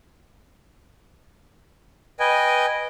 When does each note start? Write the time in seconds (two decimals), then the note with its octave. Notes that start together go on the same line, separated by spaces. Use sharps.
2.20 B4 D#5 G5 G#5